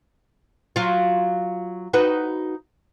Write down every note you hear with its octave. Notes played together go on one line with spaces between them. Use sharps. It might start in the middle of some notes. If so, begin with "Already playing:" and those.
F#3 F4
D#4 F#4 B4